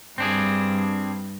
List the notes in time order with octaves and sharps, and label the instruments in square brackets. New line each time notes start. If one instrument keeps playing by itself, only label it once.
[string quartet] G2 [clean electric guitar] C4 D4 G#4